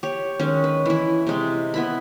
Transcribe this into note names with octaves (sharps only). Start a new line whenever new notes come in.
G4 C#5
D#3 G#3 C#4
B4
E3 E4
C3 G#3
B3 E4 B5